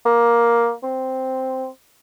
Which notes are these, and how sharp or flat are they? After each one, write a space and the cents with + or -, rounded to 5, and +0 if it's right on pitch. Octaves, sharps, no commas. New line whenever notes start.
A#3 +10
C4 -5